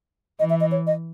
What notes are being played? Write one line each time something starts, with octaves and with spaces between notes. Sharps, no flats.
E3 D#5
E5
D#5
C#5
D#5